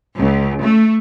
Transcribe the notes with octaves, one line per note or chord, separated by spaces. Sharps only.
C#2
A3